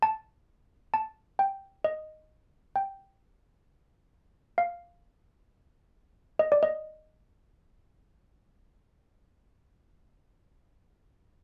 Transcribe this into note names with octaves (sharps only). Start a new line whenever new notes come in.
A5
A5
G5
D#5
G5
F5
D#5
D5
D#5